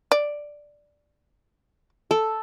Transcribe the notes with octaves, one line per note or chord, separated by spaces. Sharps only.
D5
A4